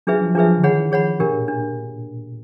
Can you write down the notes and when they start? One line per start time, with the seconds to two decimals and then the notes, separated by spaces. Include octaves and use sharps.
0.07 F#3 D4 F4 G#4 B4 E5
0.21 F3
0.35 F3 D4 F4 G#4 B4 E5
0.58 D3
0.63 D#3 G#4 C#5 F#5 B5
0.78 E3
0.91 F3 G#4 C#5 F#5 B5
1.20 B2 D4 G4 A#4
1.34 A#2
1.48 A#2 D4